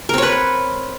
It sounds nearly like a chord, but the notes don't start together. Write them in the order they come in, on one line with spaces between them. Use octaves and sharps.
A#4 C4 C#5 B4